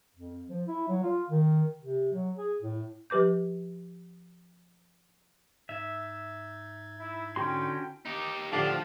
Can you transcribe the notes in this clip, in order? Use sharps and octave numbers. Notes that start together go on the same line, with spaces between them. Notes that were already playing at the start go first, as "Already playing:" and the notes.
F2
F3
E4
F#3
F4
D#3
C3
F#3
G#4
A2
F3 G4 B4 D6 G6
G#2 D#4 E5 G#6
E4
D3 C#4 E4 F#4 G5 C6
D#4 G4
D2 A2 F3 D4 G4 F5 A5